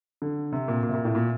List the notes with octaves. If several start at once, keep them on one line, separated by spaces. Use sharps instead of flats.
D3
C3
A#2
A#2
C3
A#2
A2
A#2